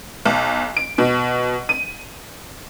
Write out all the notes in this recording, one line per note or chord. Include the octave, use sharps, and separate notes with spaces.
B1
D7
B2
D#7